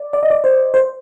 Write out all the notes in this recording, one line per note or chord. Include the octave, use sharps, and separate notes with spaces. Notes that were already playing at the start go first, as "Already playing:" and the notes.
Already playing: D5
D5
D#5
D5
C5
C5